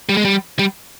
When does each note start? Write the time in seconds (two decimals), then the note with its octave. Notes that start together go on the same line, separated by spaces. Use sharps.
0.09 G3
0.17 G#3
0.25 G3
0.59 G3